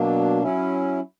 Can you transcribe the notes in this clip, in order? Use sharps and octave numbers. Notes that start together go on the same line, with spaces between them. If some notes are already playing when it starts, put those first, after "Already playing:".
Already playing: B2 F#3 A#3 D4
F#3 C#4 E4